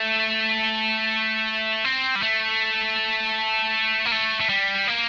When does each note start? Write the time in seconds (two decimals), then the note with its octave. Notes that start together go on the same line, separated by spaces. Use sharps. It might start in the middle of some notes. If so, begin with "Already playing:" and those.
Already playing: A3
1.85 C4
2.16 G3
2.22 A3
4.06 A#3
4.12 A3
4.40 A3
4.49 G3
4.88 A#3